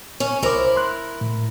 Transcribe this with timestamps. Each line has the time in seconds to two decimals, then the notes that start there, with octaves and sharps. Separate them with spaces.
0.20 C#4
0.43 C2 E4 A#4 C5 D6
0.76 C6 F#6
1.21 A2